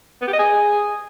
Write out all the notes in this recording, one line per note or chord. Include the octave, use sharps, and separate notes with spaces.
B3
G4
D#5
G#4